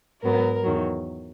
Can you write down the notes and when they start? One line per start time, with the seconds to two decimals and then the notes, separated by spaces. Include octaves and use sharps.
0.22 G#2 F#3 B3 A#4
0.63 E2 D#3 F#3